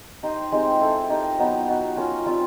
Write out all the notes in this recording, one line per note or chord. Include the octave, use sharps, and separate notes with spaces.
D#4 G4 C5 D#5
G#3 C4 D#4 G4
E4 A4 C5
D#4 G4 A#4 D#5
F#3 B3 D#4 G4
B3 D#4 F#4
C#4 F4 A#4
G3 C4 F4